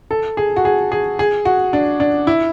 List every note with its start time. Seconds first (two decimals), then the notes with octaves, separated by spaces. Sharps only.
0.11 A4
0.37 G#4
0.56 F#4
0.65 G#4
0.92 G#4
1.19 G#4
1.45 F#4
1.73 D4
2.00 D4
2.27 E4